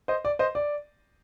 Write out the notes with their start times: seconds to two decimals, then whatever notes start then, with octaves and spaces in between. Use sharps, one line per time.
0.08 C5 D#5
0.25 D5
0.39 C5 D#5
0.55 D5